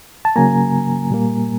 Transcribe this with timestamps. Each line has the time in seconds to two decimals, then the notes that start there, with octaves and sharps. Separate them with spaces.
0.25 A5
0.36 C#3 F#3 A#3 G#5 A#5
1.10 A#2 G3 A#3